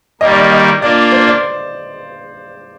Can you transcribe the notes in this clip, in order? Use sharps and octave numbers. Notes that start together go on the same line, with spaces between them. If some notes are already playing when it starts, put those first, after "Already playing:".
D#3 G3 A#3 D#5
D5
D#5
D#5
A#3 D4 F4 D5
C5
D5